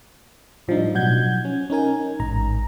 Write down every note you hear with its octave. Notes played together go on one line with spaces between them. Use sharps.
A2 F3 G3 D4 D#4
B2 F#3 F#5 G6 G#6
C#4
C#4 D#4 A#4 G#5
A1 G#2 A#5